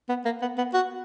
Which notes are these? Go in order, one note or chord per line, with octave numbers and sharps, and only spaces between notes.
B3
A#3
B3
B3
F#4